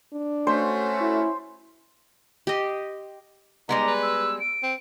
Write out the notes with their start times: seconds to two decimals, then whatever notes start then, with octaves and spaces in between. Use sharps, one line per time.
0.13 D4
0.47 A3 C#4 F#4 C5
1.01 E4
2.47 G4 D#5 C6
3.69 G3 G#3 B3 D#4 A#5
3.87 B4
4.02 E6
4.40 D7
4.63 C4